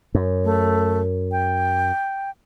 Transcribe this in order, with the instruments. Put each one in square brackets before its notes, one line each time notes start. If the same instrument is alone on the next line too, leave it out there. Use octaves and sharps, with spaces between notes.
[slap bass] F#2
[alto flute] A3
G5